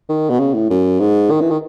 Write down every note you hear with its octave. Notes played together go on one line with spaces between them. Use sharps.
D#3
B2
C#3
A2
F#2
G#2
D#3
E3
D#3